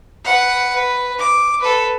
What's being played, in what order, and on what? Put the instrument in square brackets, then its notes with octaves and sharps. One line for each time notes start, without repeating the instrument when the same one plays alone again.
[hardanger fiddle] B4 F#5
B4
D6
A4 B4